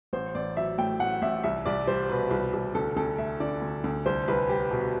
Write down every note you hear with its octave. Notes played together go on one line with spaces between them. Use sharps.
A1 C5
A1 D5
F#3 E5
A2 G5
A1 F#5
A1 E5
C2 E5
C2 D5
G3 C5
B2 B4
C2
C2
D2 A4
D2 A4
A3 E5
D3 D5
D2
D2
C2 C5
C2 B4
G3 G4
B2